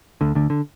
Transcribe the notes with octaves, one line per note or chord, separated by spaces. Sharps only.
D2 D3
D2 D3
D3